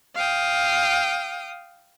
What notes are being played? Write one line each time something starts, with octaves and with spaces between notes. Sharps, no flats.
F5 G5 D#6